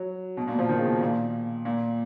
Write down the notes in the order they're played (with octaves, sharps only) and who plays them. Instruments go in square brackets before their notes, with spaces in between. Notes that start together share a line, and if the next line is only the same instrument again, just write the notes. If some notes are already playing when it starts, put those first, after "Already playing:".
Already playing: [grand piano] F#3
B2
A#2
F3
D#3
C#3
B2
A#2
A#2